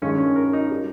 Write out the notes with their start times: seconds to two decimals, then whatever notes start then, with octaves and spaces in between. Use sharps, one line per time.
0.02 G2 D#3 G#3 C#4
0.18 C#4
0.36 A#4
0.53 D#4
0.71 G3